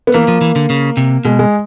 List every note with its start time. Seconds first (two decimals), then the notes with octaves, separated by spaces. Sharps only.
0.07 B3
0.14 E3 A#3
0.28 F3
0.41 E3
0.56 D3
0.70 C#3
0.97 C3
1.25 B2 G#3
1.39 G#3